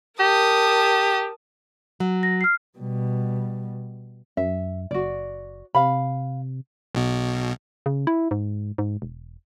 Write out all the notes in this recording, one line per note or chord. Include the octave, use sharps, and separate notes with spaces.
G4 A#4 A5 D#6
F#3
A#6
F6 C7
B2 G3
F#2 E5
F#1 F#4 D5
C3 F5 B5
B1 B2
C#3
E4
G#2
G#2
E1